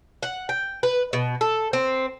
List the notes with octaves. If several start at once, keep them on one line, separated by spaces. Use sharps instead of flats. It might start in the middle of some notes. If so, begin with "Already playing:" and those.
F#5
G5
B4
B2
A4
C4